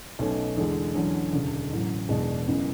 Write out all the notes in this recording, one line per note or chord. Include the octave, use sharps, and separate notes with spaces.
B1 B2 A3 C#4
E2 D3 G#3
E2 D3 F#3 C#4
E1 D2 C#3
A1 A2 F#3
E1 E2 B2 G#3 D4
F#1 F#2 C#3 E3 B3